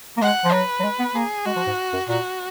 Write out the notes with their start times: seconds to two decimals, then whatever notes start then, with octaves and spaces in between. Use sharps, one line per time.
0.17 A#3
0.22 G#3 F#5
0.45 F3
0.52 F#3 B4
0.80 F#3
0.84 G#3
0.99 B3
1.15 A#3 G#4
1.46 G#3 F#4
1.56 F3
1.67 G#2
1.93 F#2
2.08 A#2 F#4